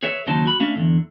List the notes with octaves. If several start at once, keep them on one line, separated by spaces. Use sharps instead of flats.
G#4 B4 C#5 E5
D#2 C#3 F#3 D#4 C5 A5
F#4 B5
A3 C#4 D4 E5 F5
E2 G2 D3